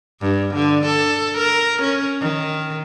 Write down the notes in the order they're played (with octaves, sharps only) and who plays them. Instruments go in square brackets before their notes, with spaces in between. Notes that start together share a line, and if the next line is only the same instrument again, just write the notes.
[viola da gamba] G2
D3
A4
A#4
C#4
D#3